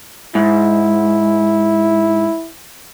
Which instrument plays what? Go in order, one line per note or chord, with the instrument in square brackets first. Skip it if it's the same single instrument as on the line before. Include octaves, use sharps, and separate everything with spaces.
[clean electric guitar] G#2 [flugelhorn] E4